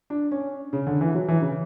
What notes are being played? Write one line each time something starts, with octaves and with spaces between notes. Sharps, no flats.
D4
C#4
C#3
D3
E3
F#3
E3
C#3